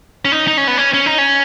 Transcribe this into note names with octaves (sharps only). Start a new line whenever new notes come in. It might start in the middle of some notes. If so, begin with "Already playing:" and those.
C#4
D#4
D#4
C#4
B3
C#4
C#4
D#4
C#4